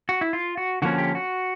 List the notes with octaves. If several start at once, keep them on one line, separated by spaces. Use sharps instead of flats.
F#4
E4
F4
F#4
D3 F3 A#3 C#4 F#4
G4
F#4